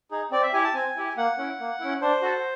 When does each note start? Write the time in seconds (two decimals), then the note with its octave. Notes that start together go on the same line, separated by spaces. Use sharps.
0.11 D#4 G#4
0.31 C4 D5
0.43 E5
0.53 E4 G4 G#5
0.64 A5
0.74 C4 G#5
0.96 E4 G4
1.17 A#3 F#5
1.38 C#4 E4
1.60 A#3
1.80 C#4 E4
2.01 D4 C5
2.22 F#4 A4